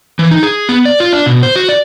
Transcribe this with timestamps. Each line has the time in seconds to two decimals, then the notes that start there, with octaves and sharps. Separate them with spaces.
0.19 E3
0.31 D#4
0.43 G#4
0.69 B3
0.85 D5
1.00 F4
1.13 D4
1.26 B2
1.43 C5
1.56 F#4
1.69 D5